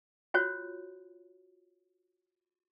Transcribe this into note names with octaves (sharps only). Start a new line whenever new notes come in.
F4 F#4 C5 C#5